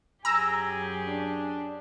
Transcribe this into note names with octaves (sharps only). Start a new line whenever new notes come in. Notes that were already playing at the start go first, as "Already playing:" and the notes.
F#2 G4 G#4 G#5 A#5 E6
D4